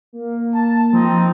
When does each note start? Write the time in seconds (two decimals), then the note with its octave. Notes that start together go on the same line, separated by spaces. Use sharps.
0.13 A#3
0.55 A5
0.93 F3 C4 D#4